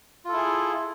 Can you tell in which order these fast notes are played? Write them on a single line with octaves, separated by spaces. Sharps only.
F4 A4 E4 G#4